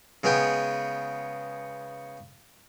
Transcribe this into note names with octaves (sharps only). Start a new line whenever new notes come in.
C#3 G#3 B3 G#4 G5